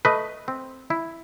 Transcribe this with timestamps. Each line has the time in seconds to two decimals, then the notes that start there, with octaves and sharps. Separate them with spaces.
0.05 A3 B4 D#5
0.48 C4
0.90 E4